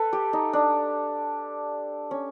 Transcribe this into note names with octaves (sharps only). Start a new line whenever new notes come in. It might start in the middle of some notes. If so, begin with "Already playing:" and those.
Already playing: A4 B4
G4
D#4
D4
C#4